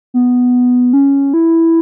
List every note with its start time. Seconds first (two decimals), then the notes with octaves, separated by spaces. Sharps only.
0.14 B3
0.93 C#4
1.34 E4